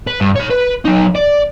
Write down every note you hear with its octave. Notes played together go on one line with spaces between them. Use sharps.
B4
G2
C#5 B5
B4
F#3 D#4
D5